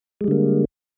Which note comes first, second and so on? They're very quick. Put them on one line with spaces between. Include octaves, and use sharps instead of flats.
G#3 G3 D3 A#3